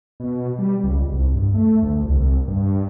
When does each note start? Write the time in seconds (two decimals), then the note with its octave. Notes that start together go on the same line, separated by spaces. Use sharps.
0.20 B2
0.59 G3
0.84 C#2
1.09 C2
1.34 G2
1.54 A3
1.83 D2
2.05 C2
2.48 G2